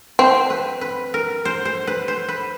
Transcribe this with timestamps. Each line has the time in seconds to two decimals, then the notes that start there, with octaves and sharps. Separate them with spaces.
0.19 C4 C5
0.50 B4
0.81 B4
1.14 A#4
1.45 C5
1.65 C5
1.87 B4
2.08 C5
2.29 B4